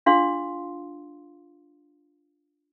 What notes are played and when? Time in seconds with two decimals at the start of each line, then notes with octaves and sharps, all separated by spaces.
0.06 D4 F4 G#4 F5 C6